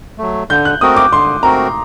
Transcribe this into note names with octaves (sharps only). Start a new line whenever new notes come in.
F#3 A3
D3 G6
F#6
A3 C4 F#4 A#4 D#6
D6
D3 C6
A3 C4 F#4 A#4 A#5